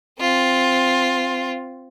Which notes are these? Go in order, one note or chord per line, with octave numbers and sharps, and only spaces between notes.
C4 F4